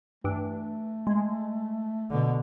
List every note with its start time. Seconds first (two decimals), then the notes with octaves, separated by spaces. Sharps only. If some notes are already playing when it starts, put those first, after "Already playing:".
0.24 G2 E3 A3 D4
1.07 G#3
2.10 B2 D3